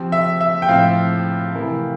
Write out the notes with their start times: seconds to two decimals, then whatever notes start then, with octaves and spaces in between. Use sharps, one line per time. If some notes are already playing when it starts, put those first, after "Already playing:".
Already playing: F3 C4 G4
0.12 E5
0.41 E5
0.62 G5
0.68 A2 F3 C4 F5
1.54 C3 E3 A3 E4 A#4